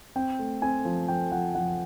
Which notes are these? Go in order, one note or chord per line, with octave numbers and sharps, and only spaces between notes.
C4 G5
A3
C4 G#5
F3
F3 G5
F3 F#5
F3 F#5